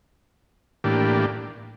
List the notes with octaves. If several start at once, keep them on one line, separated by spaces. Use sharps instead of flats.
A2 E3 A#3 D4 G4